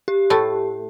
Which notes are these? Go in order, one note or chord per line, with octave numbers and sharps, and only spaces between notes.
G4
A2 A3